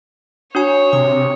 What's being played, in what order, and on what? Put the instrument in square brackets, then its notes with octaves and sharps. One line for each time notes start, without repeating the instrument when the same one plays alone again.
[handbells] D4 F#4 G#5 [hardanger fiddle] C#5
[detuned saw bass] C3 [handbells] D#6